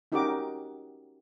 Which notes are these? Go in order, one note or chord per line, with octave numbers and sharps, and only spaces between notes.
C#4 D#4 F#4 G4 A#4 D6